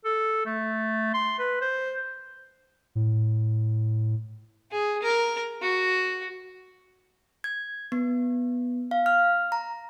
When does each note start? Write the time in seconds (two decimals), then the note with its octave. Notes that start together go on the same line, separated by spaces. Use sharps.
0.05 A4
0.46 A3
1.14 C6
1.39 B4
1.61 C5
2.95 A2
4.71 G#4
5.02 A#4
5.62 F#4
7.44 G#6
7.92 B3
8.91 F5
9.06 F6
9.52 A#5